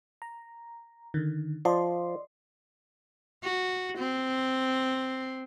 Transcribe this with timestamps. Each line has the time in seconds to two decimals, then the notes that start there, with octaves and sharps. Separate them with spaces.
0.22 A#5
1.14 D3 D#3
1.65 F3 D5 D#5 C6
3.43 F#4
3.98 C4